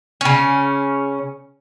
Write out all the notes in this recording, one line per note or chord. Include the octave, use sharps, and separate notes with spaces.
C#3 C#4